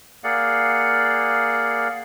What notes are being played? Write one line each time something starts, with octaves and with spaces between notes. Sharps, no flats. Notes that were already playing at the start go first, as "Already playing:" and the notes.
A#3 G#4 D5 F5 F#5